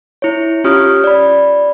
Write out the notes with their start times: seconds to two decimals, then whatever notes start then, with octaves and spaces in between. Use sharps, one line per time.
0.22 E4 C#5
0.64 C#4 F4 G4 C#5 D#6 F6
1.04 D5 B5